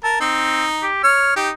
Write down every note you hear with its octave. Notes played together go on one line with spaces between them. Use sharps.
A#4 A5
C4 D#4
G4
C#5 F6
D#4 G4